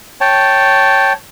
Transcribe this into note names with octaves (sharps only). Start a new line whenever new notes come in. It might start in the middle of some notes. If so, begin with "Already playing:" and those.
C#5 G5 A5